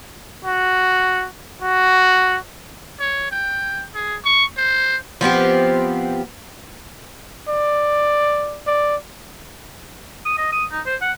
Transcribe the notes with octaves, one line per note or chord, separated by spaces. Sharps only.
F#4
F#4
C#5
G5
G#4
C#6
C5
F3 B3 C4 G4
D5
D5
D#6
D#5
D#6
D#4
C5
F#5